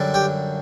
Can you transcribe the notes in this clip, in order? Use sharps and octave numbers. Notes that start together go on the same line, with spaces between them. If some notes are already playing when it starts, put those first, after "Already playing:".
Already playing: F#2 D3 G3 D4
G4